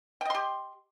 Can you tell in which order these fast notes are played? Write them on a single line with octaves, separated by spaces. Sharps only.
G5 D#5 C6 G4